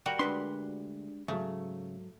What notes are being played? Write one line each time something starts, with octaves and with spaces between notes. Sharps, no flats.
G3 F#4 A#4
D2 G#3 D4 B4 C6
G#2 C#3 F#3 A3